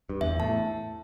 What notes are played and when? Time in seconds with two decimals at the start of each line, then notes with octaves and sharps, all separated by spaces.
0.09 G2
0.21 E2 E5
0.39 A2 A5